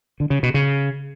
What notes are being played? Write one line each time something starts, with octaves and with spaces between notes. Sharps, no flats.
D3
C#3
B2
C#3